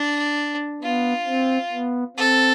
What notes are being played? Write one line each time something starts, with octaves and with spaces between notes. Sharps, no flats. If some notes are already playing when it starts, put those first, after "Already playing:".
Already playing: D4
B3 F4
C4
B3
C4 A4